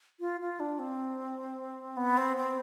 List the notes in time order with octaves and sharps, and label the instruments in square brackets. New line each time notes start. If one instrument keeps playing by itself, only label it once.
[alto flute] F4
F4
D4
C4
B3
C4
C4